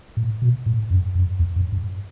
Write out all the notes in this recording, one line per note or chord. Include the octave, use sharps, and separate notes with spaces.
A2
B2
A2
F#2
F#2
E2
F#2
G2